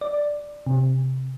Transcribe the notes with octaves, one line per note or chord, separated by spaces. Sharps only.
D5
C3